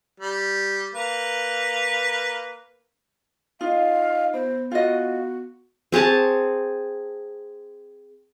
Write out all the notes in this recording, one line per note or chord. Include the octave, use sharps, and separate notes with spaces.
G3
A#3 B4
D#4 F4 D#5 F5
B3 C5
F4 F#4 D#5
C4 G#4 C#5 A5